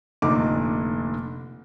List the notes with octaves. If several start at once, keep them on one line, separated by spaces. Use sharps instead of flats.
F1 A#2 D3 D#4 D6